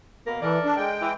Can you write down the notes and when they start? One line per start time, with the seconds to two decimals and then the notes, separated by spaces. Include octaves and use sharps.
0.27 B2 A#3 A#4
0.42 E3 A4 A#4 D5
0.65 D4
0.77 G#3 G5
1.02 E3